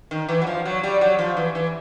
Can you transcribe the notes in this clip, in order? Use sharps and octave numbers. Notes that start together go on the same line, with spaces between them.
D#3
E3
F#3
F3
F#3
G3
F#3
F3
E3
E3